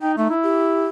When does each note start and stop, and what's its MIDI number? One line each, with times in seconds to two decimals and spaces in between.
0.01 0.17 63
0.01 0.12 79
0.17 0.25 57
0.17 0.34 63
0.30 0.87 64
0.43 0.89 67